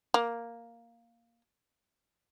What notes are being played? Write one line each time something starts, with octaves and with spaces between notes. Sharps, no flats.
A#3